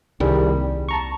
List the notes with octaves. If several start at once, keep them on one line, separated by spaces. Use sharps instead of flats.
C2 D#3 G3 G#4
D#2
A5 A#5 C#6